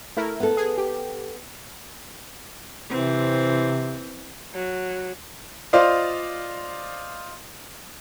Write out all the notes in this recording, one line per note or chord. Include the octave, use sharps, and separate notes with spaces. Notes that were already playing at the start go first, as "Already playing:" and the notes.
A3 E4 A#4
B3 A4
G#4
G4
C3 E3 C4
F#3
F4 C5 D5 D#5 F5